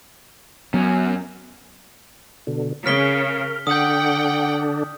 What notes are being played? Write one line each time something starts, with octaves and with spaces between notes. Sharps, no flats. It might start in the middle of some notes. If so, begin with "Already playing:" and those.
F#2 F#3 B3 C#4
B2 D3
C#3 A#4 F6 B6 G7
D3 D4 F#5 G5 D#6 G6